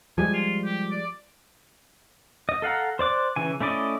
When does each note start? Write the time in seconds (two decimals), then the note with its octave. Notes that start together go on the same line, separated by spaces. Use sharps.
0.18 F3 G3 G#3 G#5
0.33 F4
0.65 G4
0.91 D5
2.49 D#5
2.62 A4 F5 F#5 A#5
2.99 C5 D5 D6 F#6
3.36 C#3 E3 G#5
3.60 A3 C#4 E4 D5 D#5